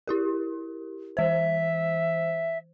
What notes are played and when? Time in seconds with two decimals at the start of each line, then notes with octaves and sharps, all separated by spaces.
0.07 E4 G4 A#4
1.17 E3 C5 E5